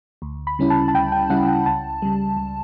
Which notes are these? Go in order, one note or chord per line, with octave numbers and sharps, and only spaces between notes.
D2
B5
C#3 G3 C#4 E4
A5
A5
D2 G5
G5
C#3 G3 C#4 E4 F#5
G5
C#2 A5
C#3 G3
C#2